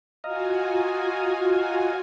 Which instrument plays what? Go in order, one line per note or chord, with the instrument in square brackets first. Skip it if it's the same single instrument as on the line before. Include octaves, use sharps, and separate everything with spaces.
[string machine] F4 F#4 G#5 [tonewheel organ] D#5 F5 A#5